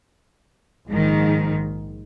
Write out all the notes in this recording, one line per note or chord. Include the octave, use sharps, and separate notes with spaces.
A#1 G#2 D#3